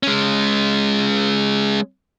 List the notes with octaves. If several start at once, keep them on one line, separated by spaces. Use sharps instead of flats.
G#3 C#4